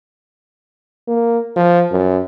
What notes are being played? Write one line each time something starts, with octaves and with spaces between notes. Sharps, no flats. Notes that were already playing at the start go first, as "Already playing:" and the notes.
A#3
F3
F#2